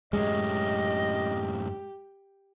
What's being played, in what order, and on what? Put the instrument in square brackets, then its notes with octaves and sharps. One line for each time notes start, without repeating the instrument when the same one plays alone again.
[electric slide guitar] F#2 A2 C#4 [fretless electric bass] G#3 [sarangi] G4 [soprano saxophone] D#5